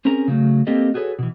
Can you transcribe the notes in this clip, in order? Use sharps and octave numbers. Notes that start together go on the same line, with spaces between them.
C4 C#4 G#4 A#4 A#5
C#3 F#3 A3
A#3 C4 G4 A4 D#5
F#4 G#4 A4 B4 C#5
B2 E3